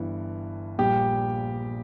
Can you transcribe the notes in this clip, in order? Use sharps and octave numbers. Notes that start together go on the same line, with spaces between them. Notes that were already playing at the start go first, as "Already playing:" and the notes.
Already playing: G1 G2 E3
A#1 A#2 G3 G4 G5